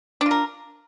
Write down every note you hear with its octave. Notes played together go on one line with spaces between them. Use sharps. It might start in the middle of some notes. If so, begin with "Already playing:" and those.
D4 F4 A#4